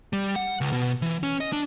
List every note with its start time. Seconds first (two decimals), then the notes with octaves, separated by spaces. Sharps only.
0.13 G3
0.36 F#5
0.61 C#2
0.73 B2
1.02 E3
1.23 C#4
1.41 D#5
1.53 D4